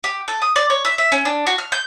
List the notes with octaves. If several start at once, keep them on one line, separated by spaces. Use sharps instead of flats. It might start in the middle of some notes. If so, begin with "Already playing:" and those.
G4
A4
D#6
D5
C#5
E5
E5
C#4
D4
F#4
F6
G6